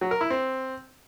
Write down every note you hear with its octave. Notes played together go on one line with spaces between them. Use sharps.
F#3
A#4
E4
C4